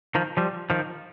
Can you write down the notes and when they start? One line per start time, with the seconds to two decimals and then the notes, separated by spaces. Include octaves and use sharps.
0.15 D#3 F3
0.37 F3 G3
0.70 D#3 F3